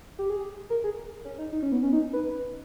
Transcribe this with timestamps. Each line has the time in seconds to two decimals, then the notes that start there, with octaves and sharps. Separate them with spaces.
0.19 G4
0.30 G#4
0.70 A#4
0.84 G#4
1.25 C#4
1.39 D#4
1.52 D#4
1.62 C#4
1.72 B3
1.83 C#4
1.93 D#4
2.13 B4